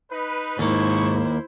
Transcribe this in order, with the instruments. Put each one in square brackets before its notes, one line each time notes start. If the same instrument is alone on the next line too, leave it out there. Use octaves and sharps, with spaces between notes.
[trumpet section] D#4 B4
[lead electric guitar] D#2 A#3 [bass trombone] G#2 [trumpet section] G#3 C#6 [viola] E4 C5